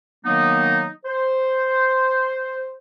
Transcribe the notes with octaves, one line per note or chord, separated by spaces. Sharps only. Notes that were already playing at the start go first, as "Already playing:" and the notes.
D#3 F#3 A#3 B3 D#4
C5